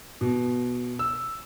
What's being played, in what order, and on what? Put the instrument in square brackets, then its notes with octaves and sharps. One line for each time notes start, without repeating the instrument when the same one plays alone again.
[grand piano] B2
E6